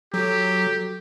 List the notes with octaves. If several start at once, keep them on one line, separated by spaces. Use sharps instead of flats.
F#3 F#4 G4 A4